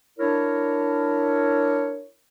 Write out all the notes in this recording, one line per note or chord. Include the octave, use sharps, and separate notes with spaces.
D4 E4 A#4 C#5